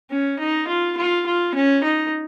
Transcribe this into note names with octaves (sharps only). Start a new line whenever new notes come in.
C#4
D#4
F4
F4
F4
C#4
D#4